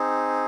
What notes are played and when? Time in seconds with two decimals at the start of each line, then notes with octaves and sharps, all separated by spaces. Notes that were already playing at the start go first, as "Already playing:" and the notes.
Already playing: C4 D#4 G#4